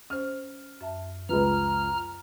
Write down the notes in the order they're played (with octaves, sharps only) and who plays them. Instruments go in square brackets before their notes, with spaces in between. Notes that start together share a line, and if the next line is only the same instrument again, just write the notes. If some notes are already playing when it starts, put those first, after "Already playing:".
[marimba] C#4 C5 [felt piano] F6
[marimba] F#2 E5 A5
[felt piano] C#2 F3 [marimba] B4 B5 [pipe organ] A#5 F6